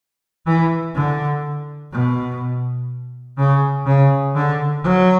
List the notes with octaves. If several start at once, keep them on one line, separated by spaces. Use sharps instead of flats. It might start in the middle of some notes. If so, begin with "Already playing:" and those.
E3
D3
B2
C#3
C#3
D3
F#3